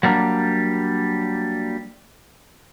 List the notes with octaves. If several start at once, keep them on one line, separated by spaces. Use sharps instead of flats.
F#3 G3 A#3 D4